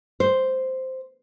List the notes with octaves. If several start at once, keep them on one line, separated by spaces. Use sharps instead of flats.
C5